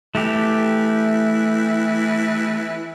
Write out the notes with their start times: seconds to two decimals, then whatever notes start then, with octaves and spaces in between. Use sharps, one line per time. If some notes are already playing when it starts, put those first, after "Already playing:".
0.15 E3 A3 G4